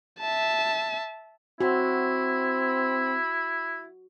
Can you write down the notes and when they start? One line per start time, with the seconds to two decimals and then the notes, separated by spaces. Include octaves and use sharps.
0.20 E5 A5
1.61 C4 E4 F#4